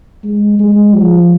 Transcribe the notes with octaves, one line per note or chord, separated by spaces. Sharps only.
G#3
G#3
F3